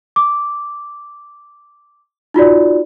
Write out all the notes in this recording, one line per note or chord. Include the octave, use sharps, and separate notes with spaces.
D6
D#4 F4 F#4 D5